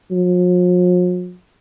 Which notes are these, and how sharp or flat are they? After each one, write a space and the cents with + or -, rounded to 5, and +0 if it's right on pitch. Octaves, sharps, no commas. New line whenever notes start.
F3 +45